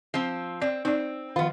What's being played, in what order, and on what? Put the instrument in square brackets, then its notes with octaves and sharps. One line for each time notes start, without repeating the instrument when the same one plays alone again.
[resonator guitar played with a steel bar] F3 C4
[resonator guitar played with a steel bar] C4 [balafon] D5
[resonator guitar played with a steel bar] C4 [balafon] D#4 D5
[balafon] D#3 F3 [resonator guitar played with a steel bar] B3 F4